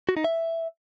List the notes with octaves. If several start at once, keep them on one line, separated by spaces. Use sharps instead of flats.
F#4
D#4
E5